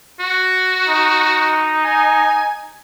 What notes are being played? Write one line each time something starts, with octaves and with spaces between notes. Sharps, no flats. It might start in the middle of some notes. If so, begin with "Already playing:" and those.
F#4
D#4
G#5